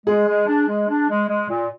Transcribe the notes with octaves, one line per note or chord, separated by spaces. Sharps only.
G#3 G#4
G#3
D4
G#3
D4
G#3
G#3
A#2